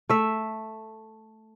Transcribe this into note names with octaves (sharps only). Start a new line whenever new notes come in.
A3 E5